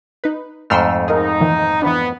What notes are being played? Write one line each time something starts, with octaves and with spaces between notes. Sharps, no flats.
D#4 B4
F2 G#2 A3 C6 E6 F6
D#4 G#4 A#4
A#2 D#3 E3
E3 B3 D4